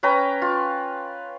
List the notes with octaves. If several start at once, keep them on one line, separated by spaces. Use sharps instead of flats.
C#4 B4 G5 A#5
F4